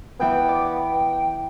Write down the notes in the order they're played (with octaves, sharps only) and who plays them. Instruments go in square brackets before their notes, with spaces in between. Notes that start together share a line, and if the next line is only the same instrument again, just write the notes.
[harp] E3 G6 [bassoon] B3 [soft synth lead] G5
[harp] D5